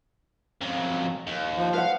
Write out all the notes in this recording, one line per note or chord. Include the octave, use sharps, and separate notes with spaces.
F2 F#3
D#2
F3
B4 F5 F#5